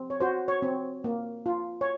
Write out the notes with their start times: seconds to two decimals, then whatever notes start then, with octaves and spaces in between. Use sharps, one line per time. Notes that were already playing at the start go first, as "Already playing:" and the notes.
Already playing: C4
0.10 C#5
0.20 F#4 C5
0.48 C#5
0.62 C4
1.04 A#3
1.46 F4
1.81 C#5